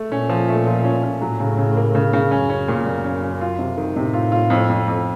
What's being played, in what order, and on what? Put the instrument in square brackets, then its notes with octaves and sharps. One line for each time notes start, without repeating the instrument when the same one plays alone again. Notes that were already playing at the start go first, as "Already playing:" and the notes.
Already playing: [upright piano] A3
[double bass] A#2 [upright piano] C#4
[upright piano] F3
A3
F3
C#4
C#4
[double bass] A2 [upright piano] F#3
[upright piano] C#3
C#3
A#3
C#3
C#3
[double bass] F#2 [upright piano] C#4
[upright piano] C#4
A#2
[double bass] F#2 [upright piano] A#2
[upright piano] C#4
C#4
F4
C3
D#3
[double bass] A2 [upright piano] C3
[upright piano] F4
F4
F2
F2
F2